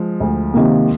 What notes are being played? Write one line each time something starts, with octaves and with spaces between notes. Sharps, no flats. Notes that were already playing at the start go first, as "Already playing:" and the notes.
Already playing: F3 G#3
D2
C3 D#3 A#3